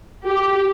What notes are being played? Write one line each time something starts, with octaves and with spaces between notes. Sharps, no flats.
G4